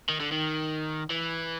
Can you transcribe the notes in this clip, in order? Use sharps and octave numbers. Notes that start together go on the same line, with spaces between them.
D#3
D3
D#3
E3